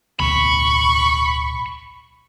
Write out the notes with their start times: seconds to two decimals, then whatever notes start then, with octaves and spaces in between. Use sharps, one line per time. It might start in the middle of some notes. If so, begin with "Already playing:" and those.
0.20 D1 B1 B5 C#6